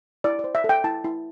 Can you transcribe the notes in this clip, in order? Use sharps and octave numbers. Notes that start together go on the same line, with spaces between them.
E4 D5
C5 D5
E5
A4
G5
E4 A5
E4